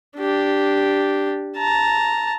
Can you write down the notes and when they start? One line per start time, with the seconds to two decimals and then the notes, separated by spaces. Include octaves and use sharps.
0.18 D4 G4
1.57 A5 A#5